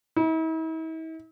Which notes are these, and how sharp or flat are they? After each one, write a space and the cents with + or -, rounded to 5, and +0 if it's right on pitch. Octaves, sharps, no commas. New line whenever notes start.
E4 -45